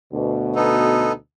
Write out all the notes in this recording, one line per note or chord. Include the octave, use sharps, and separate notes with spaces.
D2 B2
B3 D#4 A4